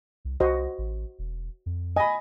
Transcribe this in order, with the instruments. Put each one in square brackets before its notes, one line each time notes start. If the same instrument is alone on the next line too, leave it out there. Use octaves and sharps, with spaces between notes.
[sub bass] C2
[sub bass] C2 [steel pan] F#4 C5 D#5
[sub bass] A1
E1
F2
[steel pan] D#5 [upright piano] G#5 B5